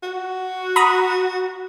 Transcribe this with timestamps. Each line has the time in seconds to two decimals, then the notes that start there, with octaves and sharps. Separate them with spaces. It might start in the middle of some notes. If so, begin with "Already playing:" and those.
0.03 F#4
0.76 A#5 B5 D#6